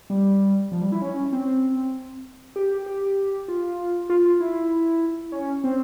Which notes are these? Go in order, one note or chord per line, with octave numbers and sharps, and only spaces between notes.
G3
F3
G3
E4
C#4
C4
G4
G4
F4
F4
E4
C#4
C4